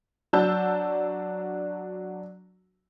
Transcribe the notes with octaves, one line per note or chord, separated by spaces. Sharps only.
F#3 D4 F#4 A5 E6 G6